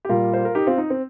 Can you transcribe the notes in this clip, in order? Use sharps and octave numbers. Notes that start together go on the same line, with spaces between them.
G4
A#2 G3 F4 A#4
C5
A#4
D#4 G4
C4 F4
D#4
C4